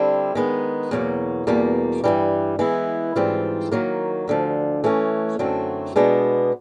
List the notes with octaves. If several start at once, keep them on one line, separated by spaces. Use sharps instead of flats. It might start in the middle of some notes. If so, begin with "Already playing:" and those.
Already playing: D3 G3 C4 E4
D#3 G#3 B3
E2 B2 F#3 A#3
E2 B2 G3 A#3
G2 E3 G3
E3 G#3 B3 E4
G#2 E3 G3 C4 F4
D#3 F#3 A#3
D2 D3 F3
E3 A3 C#4
F#2 D3 F#3 A3 C4
B2 G#3 B3 D4